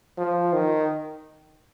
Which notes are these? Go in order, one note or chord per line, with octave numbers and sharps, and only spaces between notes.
F3
D#3